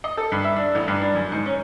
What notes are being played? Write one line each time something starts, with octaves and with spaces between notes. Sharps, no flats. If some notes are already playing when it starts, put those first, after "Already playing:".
D#5
A4
G2
E5
D4
A1
G2
D4
F#2
G#2
C#4